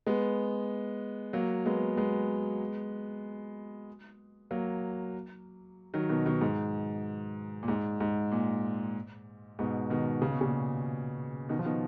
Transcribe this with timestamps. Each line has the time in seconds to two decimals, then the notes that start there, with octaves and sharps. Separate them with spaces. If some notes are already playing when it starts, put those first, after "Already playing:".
0.07 G#3 B3
1.33 F#3 A#3
1.65 G#3 B3
1.97 G#3 B3
4.51 F#3 A#3
5.94 D#3 F#3
6.09 B2 D#3
6.26 B2 D#3
6.41 G#2
7.63 A#2
7.68 G#2
8.01 G#2
8.32 A#2
9.59 G#2 B2
9.90 B2 D#3
10.22 C#3
10.32 B2
10.41 A#2 C#3
11.49 B2 D#3
11.59 F3
11.65 B2 D#3